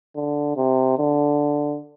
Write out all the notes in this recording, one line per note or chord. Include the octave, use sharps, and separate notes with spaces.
D3
C3
D3